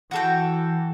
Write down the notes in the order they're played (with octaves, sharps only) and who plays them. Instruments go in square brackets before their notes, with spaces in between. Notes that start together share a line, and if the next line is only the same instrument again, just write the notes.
[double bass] E3 [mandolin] F#4 A4 G5